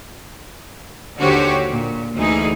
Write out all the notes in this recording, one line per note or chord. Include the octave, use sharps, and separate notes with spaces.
D#2 D3 F#4 G4 C5 C#5
A#2
D2 E3 D#4 G#4